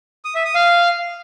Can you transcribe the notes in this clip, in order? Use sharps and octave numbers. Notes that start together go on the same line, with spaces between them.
D#6
E5
D#6
F5